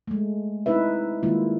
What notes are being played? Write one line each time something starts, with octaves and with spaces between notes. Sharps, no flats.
G#3 A3
C4 D#4 E4 B4 E5
D#3 G3 G#3 A#3 E4 F4